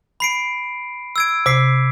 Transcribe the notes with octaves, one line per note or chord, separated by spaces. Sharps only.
B5 C7 D7
E6 G#6 D7
C3 D6 B6 C7